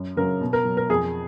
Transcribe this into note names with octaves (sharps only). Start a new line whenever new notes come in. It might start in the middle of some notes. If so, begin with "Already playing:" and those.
Already playing: F#2
C#3 F#3 A#4
B2
A#4
F#3
A#4
F2 G#4